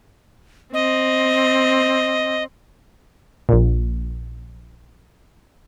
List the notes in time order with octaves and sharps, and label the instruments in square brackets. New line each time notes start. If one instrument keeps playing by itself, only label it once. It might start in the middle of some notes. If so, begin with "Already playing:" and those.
[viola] C4 [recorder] D#5
[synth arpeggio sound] A#1 A#2